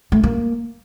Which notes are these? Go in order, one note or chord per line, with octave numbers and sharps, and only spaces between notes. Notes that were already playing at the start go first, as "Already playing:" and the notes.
A3
A#3